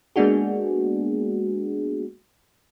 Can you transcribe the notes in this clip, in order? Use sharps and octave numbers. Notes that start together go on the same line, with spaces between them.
G#3 A#3 B3 D4 F#4 G#4